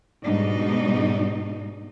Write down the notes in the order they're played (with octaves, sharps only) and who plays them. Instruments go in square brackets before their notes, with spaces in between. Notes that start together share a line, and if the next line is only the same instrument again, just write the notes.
[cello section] G#2 B2 G3 D4 D#4